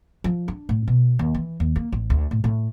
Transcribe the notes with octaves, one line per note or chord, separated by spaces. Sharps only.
F3
D4
A2
B2
D#2
E3
D#2
A#3
A1
D2
A2
A2